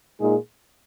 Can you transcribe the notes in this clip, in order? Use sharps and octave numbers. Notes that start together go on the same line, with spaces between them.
A#2 G#3 D#4 G#4